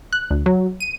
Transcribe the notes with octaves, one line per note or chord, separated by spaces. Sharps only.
F#6
D2
F#3
D#7